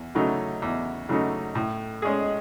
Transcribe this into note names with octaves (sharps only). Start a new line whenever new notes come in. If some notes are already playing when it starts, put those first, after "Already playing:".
Already playing: E2
C#3 F#3 A3 D#4
E2
C#3 F#3 A3 D#4
A2
G#3 C#4 G#4